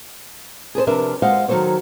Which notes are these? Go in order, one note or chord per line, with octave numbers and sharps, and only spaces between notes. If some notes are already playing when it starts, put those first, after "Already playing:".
G#4 A4 B4 C5
C3 F3 D4 A#4 B4 E5
G#3 F4 C5 F5 F#5
D#3 F#3 D4 A4 C5 C#5